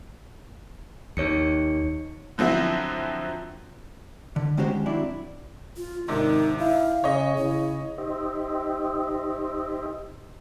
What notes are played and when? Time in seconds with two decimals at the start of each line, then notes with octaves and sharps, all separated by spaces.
1.17 D#2 D#4 C#5 C#7
2.38 D3 F3 F#3 C4 E4
4.36 D3
4.57 D#3 G#3 C#4 F#4 G4 C5
4.86 F#3 C4 D4 E4 D5
5.77 F4
6.08 G#2 C3 D#3 D4 D#4
6.59 E4 F5
7.04 C#3 C#5 D#5
7.38 C#3 E4
7.98 D#4 G4 C5 D#5 E5